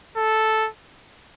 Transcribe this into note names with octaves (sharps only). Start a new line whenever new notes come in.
A4